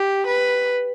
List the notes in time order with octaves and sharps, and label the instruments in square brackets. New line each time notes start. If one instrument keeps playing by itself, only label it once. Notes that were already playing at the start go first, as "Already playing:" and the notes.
Already playing: [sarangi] G4
B4